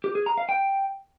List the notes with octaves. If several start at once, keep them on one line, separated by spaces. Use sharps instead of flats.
G4
G#4
A#5
F5
G5